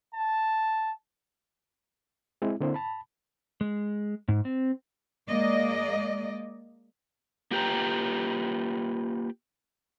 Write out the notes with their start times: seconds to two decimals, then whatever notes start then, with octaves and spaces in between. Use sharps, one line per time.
0.14 A5
2.42 G#3 C4 E4
2.60 D3 A#3 C4 E4 C5
2.74 A5 B5
3.61 G#3
4.28 G#2
4.45 C4
5.30 G#3 A#3 D5 D#5
7.51 A#3 F4 G4 B4 G5 A#5